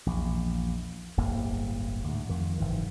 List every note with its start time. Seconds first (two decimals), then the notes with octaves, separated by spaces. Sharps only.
0.06 A#1 E2
1.17 D1 G1 A2 A#3
2.04 D2 G#2
2.29 F2 D#3
2.58 F#1 G#2 E3